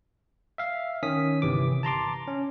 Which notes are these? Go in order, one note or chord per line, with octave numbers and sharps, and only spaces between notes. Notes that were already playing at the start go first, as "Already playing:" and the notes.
E5 F5
D#3 C#4 D#6 B6
G1 C3 E3 D6
A5 A#5 C6 D6
C#4